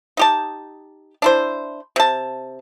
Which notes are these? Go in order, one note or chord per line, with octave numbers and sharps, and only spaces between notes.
D#4 G4 A5
D4 E4 C5
C3 A5